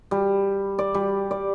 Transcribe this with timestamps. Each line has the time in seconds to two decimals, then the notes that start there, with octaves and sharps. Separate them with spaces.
0.11 G3
0.79 D5
0.94 G3
1.31 D5